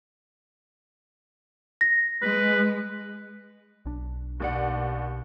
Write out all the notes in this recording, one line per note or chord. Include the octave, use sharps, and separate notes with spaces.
A#6
G#3 B4
B1 D4
D#2 B2 D5 F#5